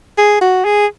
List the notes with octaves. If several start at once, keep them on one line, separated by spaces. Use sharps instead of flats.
G#4
F#4
G#4